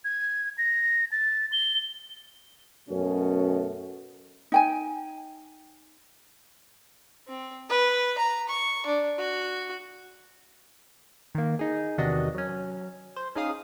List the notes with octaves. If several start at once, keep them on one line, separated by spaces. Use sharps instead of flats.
G#6
A#6
A6
G7
F#2 B2 A3 C#4
D#4 G5 G#5
C4
B4
A#5
C#6
D4
F#4
D#3 A#3
D#4 G#4
E2 C3 D#3 D4 F#4 D#5
F#3 C#4
C5
C#4 D#4 G#4 F5 D#6